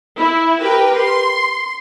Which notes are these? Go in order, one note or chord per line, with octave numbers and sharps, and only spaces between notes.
E4
G4 A#4 B4 G5
C6